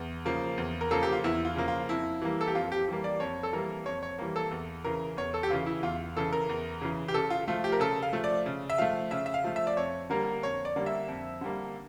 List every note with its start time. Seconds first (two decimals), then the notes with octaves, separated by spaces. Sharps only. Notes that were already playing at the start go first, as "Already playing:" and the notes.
Already playing: E2
0.25 C#3 F3 A#3
0.58 E2
0.81 A#4
0.91 C#3 F3 A#3 A4
1.03 G4
1.12 F4
1.24 E2 E4
1.45 F4
1.56 C#3 F3 A#3
1.68 F4
1.89 F2 E4
2.22 E3 G3 A#3
2.41 A4
2.48 G4
2.55 F2 F4
2.72 G4
2.88 E3 G3 A#3
3.04 D5
3.20 F2 C#5
3.43 A4
3.53 E3 G3 A#3 A#4
3.86 F2 C#5
4.03 C#5
4.18 E3 G3 A#3
4.36 A4
4.51 E2
4.84 C#3 E3 A#4
5.17 E2 C#5
5.34 A4
5.43 G4
5.50 C#3 E3 F4
5.66 E4
5.83 E2 F4
6.17 C#3 E3 A4
6.33 A#4
6.49 E2
6.81 C#3 E3
7.08 G4
7.14 C#3 A4
7.30 F4
7.48 F3 A3 F4
7.64 G4
7.72 A#4
7.80 C#3 A4
8.02 F5
8.13 F3 A3
8.24 D5
8.46 C#3
8.70 E5
8.78 F3 A3 F5
9.11 C#3 E5
9.26 E5
9.34 F5
9.44 F3 A3
9.56 E5
9.67 D5
9.77 F2 C#5
10.10 D3 G3 A#3 A#4
10.43 F2 C#5
10.65 D5
10.76 D3 G3 A#3
10.86 E5
11.08 F2
11.41 D3 G3 A#3